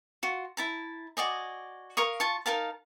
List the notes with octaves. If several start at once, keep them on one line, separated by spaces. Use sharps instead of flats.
F4 F#4
E4 A5 A#5
F#4 D5 D#5 G#5
A#4 F5 C#6 D#6
F4 A5 C#6
D#4 A#4 F5 A5